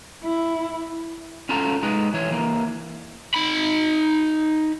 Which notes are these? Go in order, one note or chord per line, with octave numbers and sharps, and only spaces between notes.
E4
C#4 F4 F#4 A4 A#5
G#3 D#4 B4
E3 C#5
E3 A#3
D#4 B5